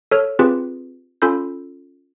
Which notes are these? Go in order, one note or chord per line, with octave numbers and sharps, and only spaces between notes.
A4 C#5 F6
C4 F4 G4 G#4 B4
C#4 F4 A4 B5 G6